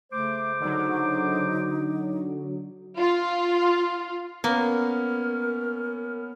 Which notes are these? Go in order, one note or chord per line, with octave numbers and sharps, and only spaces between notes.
C#3 A3 C5 D6
D3 F#3 D#4
F4
A#3 B3 C#4 A#4